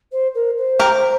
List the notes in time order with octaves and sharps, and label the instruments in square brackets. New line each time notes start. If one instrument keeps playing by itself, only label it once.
[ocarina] C5
A#4
C5
[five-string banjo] G4 A#4